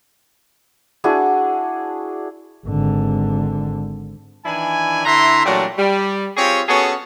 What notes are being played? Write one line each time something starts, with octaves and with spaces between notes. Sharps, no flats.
D4 E4 F#4 G#4
G#1 D3
D#3 E3 D4 E4 G#5
D3 E4 E5 A#5 C6
A#2 E3 F#3 G3 A3 D4
G3
C4 F4 G4 G#4 C#5
B3 C#4 F#4 G#4 A4 C#5